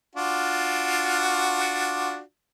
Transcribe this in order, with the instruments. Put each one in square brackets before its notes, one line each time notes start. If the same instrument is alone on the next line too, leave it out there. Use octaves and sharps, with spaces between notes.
[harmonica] D4 F4 F#4